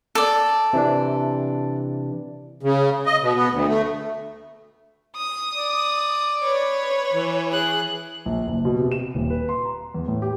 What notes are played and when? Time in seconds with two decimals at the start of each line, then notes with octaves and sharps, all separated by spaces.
0.15 A4 D5
0.73 C3 E3 D4
2.63 C#3
3.06 D#5
3.22 B2
3.35 B3
3.51 D2
3.68 A3
5.17 D#6
5.53 D5
6.43 B4 C#5
7.13 E3
7.50 G#4 F#6
8.26 A#1
8.46 F#1
8.65 B2
8.79 C3
8.92 E7
9.15 D#1
9.30 B4
9.49 C6
9.65 A#5
9.94 E2
10.08 A2
10.22 G4